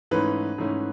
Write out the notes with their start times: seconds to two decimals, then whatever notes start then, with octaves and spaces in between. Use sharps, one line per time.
0.11 G#2 E3 A3 C#4 B4
0.58 G#2 E3 A3 C#4